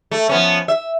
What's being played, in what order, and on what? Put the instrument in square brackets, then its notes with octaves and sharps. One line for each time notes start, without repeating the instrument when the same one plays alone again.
[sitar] A3
F3 B3 C#4
E5